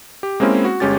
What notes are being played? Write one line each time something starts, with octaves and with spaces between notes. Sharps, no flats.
G4
G#3 A#3 C4 C#4 E4
F#4
G1 G#3 C#4 G4 A6